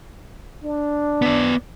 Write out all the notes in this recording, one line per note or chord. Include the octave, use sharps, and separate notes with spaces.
D4
B3 D5